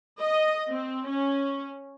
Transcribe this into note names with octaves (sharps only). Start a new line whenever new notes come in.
D#5
C4
C#4